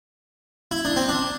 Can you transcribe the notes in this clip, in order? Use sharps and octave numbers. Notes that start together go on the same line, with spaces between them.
E4
D4
C4
D4